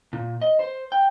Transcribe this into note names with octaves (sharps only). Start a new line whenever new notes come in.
A#2
D#5
C5
G5